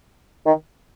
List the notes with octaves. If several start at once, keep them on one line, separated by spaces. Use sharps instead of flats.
D#3